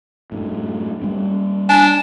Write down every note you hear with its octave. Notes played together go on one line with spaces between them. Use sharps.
F#2 A2
G3 A#3 C#4
D4 G#5